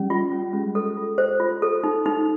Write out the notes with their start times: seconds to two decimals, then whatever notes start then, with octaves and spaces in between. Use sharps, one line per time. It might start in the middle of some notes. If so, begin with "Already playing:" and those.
Already playing: G3 C#4
0.10 F4
0.31 C#4
0.53 G#3 C#4
0.75 A4
0.97 F4
1.18 C5
1.40 F4
1.62 A4
1.84 D#4
2.06 D#4